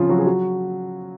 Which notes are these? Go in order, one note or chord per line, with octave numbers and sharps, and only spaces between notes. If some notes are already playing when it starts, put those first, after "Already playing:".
Already playing: C#3 F3 C4 C#4 F4
F#3 F#4
G#4
F#3 F#4